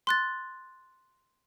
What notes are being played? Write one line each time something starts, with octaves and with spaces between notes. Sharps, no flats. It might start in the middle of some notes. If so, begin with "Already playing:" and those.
C6 F#6 A6